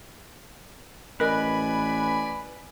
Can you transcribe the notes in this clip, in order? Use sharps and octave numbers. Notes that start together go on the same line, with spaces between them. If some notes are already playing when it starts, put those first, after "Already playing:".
A1 A#4 B4 D5 D#5 G#5 B5